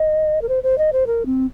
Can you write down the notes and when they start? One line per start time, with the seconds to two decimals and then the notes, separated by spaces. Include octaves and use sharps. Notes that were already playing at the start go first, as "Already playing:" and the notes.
Already playing: D#5
0.42 A#4
0.49 C5
0.63 C5
0.78 D#5
0.93 C5
1.07 A#4
1.26 C4